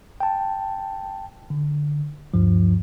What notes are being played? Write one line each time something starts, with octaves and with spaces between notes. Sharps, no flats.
G5 A5
D3
D2 G2 F3